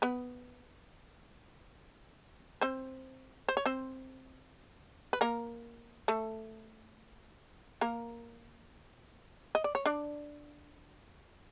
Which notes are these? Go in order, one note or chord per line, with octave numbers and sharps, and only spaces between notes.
B3 B4
C4 C5
C5
C#5
C4 C5
B4
A#3 A#4
A3 A4
A#3 A#4
D#5
D5
C#5
D4 D5